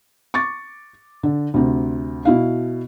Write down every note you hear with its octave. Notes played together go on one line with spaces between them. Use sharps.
C#6 D6 A6
D3
D2 C3
B2 E4 F5